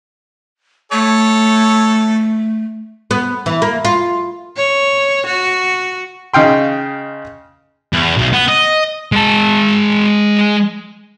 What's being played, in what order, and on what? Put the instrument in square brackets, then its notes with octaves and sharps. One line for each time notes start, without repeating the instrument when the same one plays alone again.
[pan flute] A3 [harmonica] A4 C#5
[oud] B3
E3
A#3
F4
[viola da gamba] C#5
F#4
[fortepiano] C#3 D#4 F5 G5 C6
[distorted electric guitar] E2
B1
B3
D#5
G#3 A5